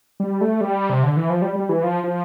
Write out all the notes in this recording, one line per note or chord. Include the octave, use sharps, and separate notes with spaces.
G3
A3
G3
C3
D3
E3
F3
G3
G3
E3
F3
F3